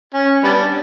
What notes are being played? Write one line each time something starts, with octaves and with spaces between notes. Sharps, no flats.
C#4
G3 B3 D4